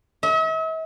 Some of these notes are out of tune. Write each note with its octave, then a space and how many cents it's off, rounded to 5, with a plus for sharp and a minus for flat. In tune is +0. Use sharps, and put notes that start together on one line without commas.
E5 -45